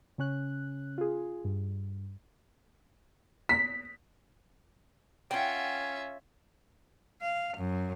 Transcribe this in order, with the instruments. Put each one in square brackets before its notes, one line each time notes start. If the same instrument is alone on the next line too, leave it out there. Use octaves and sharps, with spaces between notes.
[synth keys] C#3 C#4 F#6
F4 G#4
G2
[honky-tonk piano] B6
[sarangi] C#4 [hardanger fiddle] F4 E5 [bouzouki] F#5 G5
[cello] F5
F#2